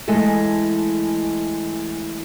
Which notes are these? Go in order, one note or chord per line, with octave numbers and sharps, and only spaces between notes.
E3 G#3 A3 A4